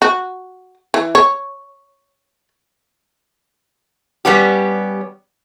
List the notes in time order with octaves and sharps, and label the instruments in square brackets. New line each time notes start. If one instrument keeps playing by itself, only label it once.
[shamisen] F#4
E3
C#5
[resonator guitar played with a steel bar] G3 B3 C#4 G4